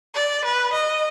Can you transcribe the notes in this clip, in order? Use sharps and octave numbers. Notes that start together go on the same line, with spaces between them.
D5
B4
D#5